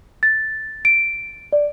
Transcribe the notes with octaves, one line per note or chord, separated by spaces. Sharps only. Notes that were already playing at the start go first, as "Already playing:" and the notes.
A6
D7
D5